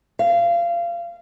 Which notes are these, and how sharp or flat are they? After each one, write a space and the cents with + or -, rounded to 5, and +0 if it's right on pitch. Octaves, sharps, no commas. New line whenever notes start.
F5 -25